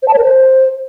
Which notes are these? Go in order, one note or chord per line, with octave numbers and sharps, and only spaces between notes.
C5
A5
C#5
A#4
C5